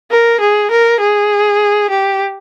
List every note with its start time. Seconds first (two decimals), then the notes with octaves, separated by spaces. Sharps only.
0.11 A#4
0.40 G#4
0.71 A#4
1.00 G#4
1.90 G4